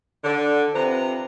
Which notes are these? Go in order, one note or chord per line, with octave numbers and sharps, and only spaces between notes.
D3
C3 F3 B4 A#5